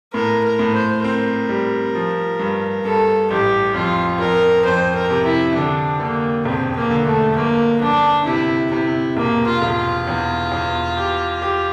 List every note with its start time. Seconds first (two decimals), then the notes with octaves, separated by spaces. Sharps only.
0.14 A2 A#4
0.44 A#4
0.59 A2
0.74 C5
1.04 C4 A#4
1.49 G3
1.95 F3
2.39 G2
2.85 G2 A4
3.30 A1 G4
3.74 F2 F4
4.20 F2 A#4
4.65 F2 C5
4.96 A#4
5.10 C3
5.25 E4
5.55 D3 D4
6.00 D3 A#3
6.45 E1 C4
6.76 A#3
6.90 D3
7.06 A3
7.36 G1 A#3
7.81 G1 D4
8.26 C3 E4
8.71 C3 E4
9.17 E1 A#3
9.46 F4
9.62 E1
9.76 F4
10.07 E2
10.52 E2
10.97 G4
11.42 G4